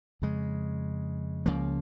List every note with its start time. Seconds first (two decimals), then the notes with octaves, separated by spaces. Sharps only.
0.22 F2 C#3 G#3
1.46 C#2 C#3 F3 A#3